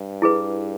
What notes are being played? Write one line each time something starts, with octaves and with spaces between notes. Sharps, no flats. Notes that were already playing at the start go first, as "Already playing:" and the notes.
Already playing: G2
E4 G#4 B4